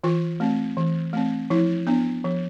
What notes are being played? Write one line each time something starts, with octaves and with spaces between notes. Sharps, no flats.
E3 F4
A3 C4
E3
A3 C4
F3 E4
B3 D4
F3